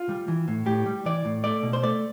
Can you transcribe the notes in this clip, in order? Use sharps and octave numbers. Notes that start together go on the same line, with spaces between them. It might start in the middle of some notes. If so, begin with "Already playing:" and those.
Already playing: F4
G3
E3
A2
A2 G4
G3
E3 D5
A2
A3 D5
B2
C5
A3 D5